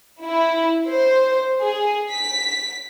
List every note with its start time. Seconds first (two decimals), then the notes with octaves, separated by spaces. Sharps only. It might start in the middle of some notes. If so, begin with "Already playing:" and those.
0.23 E4
0.89 C5
1.63 G#4
2.10 B6